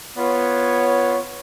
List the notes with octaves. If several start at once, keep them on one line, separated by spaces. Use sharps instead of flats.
B3 F4 C#5